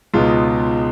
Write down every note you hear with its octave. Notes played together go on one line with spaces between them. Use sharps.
C#2 B2 G#3 B3 D#4 F4